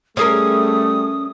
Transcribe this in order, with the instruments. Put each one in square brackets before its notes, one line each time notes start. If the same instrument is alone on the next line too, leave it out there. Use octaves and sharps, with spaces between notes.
[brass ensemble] G3 A3 [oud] C#4 G#4 A#4 [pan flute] D#6